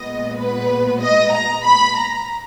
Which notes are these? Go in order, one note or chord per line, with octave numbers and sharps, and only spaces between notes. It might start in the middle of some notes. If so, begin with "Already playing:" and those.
Already playing: A#2 G#3 B3 D#5
B4
D#5
A#5
B5
A#5